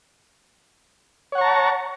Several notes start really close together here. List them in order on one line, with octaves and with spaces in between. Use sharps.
C#5 F#5 C#6 A#5 A5